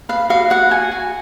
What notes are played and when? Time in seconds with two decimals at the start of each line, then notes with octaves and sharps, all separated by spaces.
0.09 B4 F5
0.29 F#4 F5
0.50 F#4 F#5
0.71 F#4 G#5
0.91 F#4